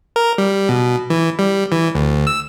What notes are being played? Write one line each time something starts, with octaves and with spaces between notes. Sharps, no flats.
A#4
G3
B2
E3
G3
E3
D2
E6